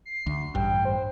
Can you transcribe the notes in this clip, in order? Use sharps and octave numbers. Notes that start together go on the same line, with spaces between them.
C7
D2
A1 G2 G5
C5